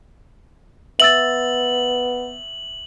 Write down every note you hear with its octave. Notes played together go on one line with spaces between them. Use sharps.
B3 E5 E6 A6 F#7